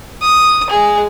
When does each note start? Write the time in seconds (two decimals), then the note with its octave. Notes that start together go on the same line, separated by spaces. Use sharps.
0.21 D#6
0.70 G#3 G#4